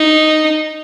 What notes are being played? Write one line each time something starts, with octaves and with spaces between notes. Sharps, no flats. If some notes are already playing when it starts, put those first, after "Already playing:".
Already playing: D#4